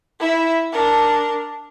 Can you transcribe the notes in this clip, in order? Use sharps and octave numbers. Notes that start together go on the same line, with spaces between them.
E4 E5
D4 A#4